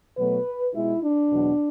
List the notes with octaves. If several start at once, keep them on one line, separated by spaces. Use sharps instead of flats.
B2 F#3 A3 B4
B2 G#3 E4
D4
E2 B2 F#3